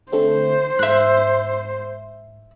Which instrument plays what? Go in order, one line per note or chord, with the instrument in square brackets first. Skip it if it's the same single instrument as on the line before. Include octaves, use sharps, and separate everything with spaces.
[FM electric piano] D3 A3 C4 [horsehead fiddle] C5
[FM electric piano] G#2 [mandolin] E5 F#6